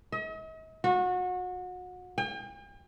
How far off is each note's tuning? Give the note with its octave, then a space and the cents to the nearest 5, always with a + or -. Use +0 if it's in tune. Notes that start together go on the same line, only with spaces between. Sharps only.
D#5 +45
F#4 -30
G5 +45